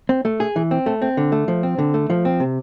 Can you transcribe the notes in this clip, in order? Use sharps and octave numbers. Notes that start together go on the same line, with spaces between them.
C4
A3
G#4
E3
C4
A3
C4
D3
A3
F3
C4
D3
A3
F3
C4
C3